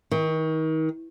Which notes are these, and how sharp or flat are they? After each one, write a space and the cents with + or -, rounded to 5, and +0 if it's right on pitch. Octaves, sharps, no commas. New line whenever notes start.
D#3 +35